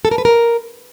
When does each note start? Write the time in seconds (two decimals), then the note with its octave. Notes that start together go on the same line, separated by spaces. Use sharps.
0.05 A4
0.11 A#4
0.18 B4
0.25 A#4